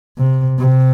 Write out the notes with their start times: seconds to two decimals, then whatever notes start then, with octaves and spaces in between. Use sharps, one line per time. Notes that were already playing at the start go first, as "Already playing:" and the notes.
0.18 C3
0.59 C3